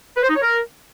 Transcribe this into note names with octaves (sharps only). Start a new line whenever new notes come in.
B4
C5
D#4
C#5
A#4